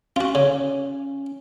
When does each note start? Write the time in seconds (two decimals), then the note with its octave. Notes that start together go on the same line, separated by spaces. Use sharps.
0.16 C#4 F4 F#4
0.35 C#3